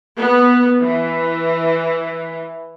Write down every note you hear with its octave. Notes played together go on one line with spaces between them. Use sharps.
B3
E3